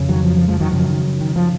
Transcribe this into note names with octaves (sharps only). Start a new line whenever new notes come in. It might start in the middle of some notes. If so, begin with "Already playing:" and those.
Already playing: F2 C#3
D#3 F#3
F3
F3
F3 G#3
D#3 F#3
F#2 C#3 F3
D#3
D#3
F3